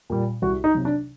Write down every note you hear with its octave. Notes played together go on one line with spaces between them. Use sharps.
A#2 G3
C2 F#4
D#4
C3 F#3
D4